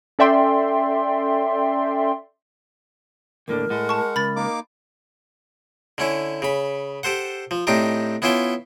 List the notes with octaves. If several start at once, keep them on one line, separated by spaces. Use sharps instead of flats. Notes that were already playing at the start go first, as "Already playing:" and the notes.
C#4 A4 D5 E5 G5 C6
D#2 A2 D3 A#4
A2 G#3 F#5
A5 C#6
C#2 B5 A6
A#3 D#4 D6
D3 C#4 E4
C#3 B5
G4 A4 C5 F#5
F3
A2 C4 D4 D#4 G4
B3 C#4 E4 F4 E5 G5